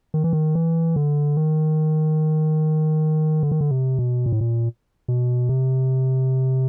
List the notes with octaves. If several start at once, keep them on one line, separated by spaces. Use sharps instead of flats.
D#3
E3
D#3
E3
D3
D#3
D3
D#3
D3
C3
B2
A#2
A2
A#2
B2
C3